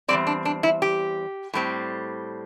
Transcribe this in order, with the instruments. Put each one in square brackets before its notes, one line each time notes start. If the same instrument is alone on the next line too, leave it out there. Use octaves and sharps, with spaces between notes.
[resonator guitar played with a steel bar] E2 D3 G3 C4 D5
D4
D4
E4
G4
A2 G3 C4